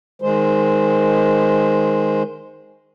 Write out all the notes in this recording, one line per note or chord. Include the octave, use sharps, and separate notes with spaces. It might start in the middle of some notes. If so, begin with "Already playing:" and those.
D#3 G#3 C5